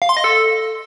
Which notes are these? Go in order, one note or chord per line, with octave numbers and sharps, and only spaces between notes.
F5
C6
D#5
A4